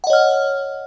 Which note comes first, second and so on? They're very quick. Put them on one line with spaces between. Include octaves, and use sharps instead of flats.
F#5 D#5 C#5 F6